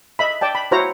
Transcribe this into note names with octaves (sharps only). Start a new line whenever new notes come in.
D#5 E5 B5
D5 G5 A5
B5
E4 F#4 C5 C#5 A#5